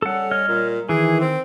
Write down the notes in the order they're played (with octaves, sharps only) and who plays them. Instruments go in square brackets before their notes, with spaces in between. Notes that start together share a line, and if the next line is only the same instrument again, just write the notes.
[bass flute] G3 [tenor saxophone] C#4 [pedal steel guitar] A4 F#5
[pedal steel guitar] C#5 D#5 F6
[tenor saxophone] A#2
[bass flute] D#3 [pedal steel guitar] E3 [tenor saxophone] G#4
[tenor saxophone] C4